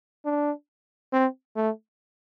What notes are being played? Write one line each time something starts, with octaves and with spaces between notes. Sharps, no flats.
D4
C4
A3